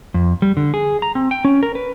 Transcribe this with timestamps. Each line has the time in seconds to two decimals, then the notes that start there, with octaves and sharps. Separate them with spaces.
0.14 F2
0.42 G3
0.57 D3
0.74 G#4
1.02 A#5
1.15 C4
1.31 G5
1.45 C#4
1.63 A#4
1.75 B4